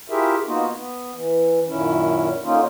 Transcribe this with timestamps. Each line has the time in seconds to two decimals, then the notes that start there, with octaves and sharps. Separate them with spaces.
0.10 E4 F4 G4 G#4 A#4 E5
0.46 A#3 B3 D#4 F4 F#4
0.71 B3
1.14 E3
1.67 F#2 A#2 D#3 C#4 E4
2.43 D3 A#3 C#4 D#4 F4